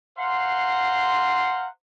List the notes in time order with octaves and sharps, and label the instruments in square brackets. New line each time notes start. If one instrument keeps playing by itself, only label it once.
[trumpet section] C5 F5 F#5 A#5 C6